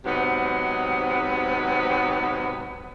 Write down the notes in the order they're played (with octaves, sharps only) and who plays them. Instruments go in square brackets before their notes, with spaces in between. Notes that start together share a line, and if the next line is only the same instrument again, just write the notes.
[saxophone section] G#2 C3 F#3 B3